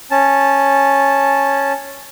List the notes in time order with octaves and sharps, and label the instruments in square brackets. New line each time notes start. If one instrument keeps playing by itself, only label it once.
[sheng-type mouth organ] C#4 A5